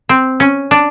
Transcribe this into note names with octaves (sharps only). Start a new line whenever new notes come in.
C4
C#4
D4